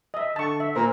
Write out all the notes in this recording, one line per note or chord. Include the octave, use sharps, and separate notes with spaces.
D#5 E5
D3 A5 C#6
E5
A#2 A#4 C5